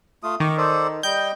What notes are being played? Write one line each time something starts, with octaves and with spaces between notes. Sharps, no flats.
A3 F4 D#6
D#3 C#6 D6
A4 C5 D5
G3 D#5 G5 G6